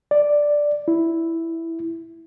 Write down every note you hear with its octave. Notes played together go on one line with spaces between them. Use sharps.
D5
E4